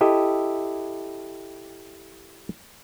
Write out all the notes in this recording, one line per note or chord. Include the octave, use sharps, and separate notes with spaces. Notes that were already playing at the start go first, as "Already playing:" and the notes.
E4 G4 A4 D#5 E5